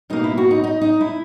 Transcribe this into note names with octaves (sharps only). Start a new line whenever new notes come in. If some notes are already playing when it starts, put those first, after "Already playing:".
B2 A#3 D#4
E4
F#4
D#4
D#4
D#4
E4